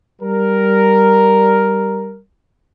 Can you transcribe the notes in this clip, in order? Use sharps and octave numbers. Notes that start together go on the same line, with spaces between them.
G3 A#4